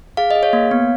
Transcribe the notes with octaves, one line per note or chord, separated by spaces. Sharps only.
G#4 F5
G#4 D#5
C#5 F5
A#3
B3